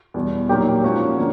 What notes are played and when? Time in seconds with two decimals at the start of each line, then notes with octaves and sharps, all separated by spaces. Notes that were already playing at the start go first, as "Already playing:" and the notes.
0.14 E2 B2 G3
0.49 A#2 F#3 A#3 D#4 G4
0.84 G#2 F3 A#3 C#4 F#4
1.18 D3 A#3